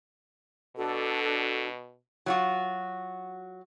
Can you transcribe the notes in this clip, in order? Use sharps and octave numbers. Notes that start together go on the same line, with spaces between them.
B2 D4 F#4 A4
F#3 F4 F#4